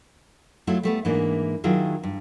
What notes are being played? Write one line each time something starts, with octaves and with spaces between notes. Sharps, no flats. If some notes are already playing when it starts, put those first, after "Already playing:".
F#3 A3 E4 F4
G3 A3 B3
G#2 E3 A#3 D4
D#3 F#3 E4 F4 G#4
G2